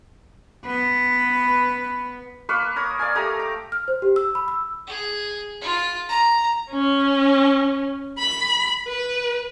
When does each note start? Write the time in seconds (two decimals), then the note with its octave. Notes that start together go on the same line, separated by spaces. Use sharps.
0.65 B3 B4
2.49 A#3 B4 F5 C#6
2.76 A#4 C#5 D#6
2.99 D5 F5 G#5
3.15 A3 G4 A#5 D#6
3.39 D6
3.72 F6
3.88 C5
4.02 G4
4.16 E6
4.35 B5
4.48 E6
4.87 G#4
5.61 F4
6.09 A#5
6.71 C#4
8.18 B5
8.88 B4